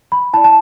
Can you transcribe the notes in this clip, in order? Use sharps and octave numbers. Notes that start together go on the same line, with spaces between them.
B5
E4 D5 A5
A5